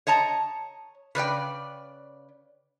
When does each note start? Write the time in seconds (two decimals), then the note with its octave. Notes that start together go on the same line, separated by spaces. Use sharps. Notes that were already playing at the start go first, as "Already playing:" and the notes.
0.07 C#5 D#5 A5 A#5
1.15 C#3 B4 D5 G5